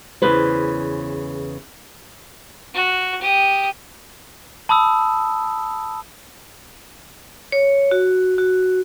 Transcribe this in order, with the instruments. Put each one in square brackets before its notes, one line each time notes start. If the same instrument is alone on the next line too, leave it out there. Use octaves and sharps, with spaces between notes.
[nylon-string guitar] E2 C#3 B4 C5
[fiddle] F#4
G4 D#6
[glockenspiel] A5 B5 D#6 E6
[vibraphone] C#5
F#4
F#4